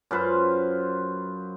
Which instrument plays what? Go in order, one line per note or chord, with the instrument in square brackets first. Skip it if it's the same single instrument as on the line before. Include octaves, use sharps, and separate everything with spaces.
[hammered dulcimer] F#2 F4 B4 C5